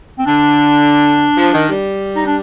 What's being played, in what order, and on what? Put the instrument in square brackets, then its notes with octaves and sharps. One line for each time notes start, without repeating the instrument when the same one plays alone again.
[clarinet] C4
[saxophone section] D3 [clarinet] D4
[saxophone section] F3
D#3
G3
[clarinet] D#4
D4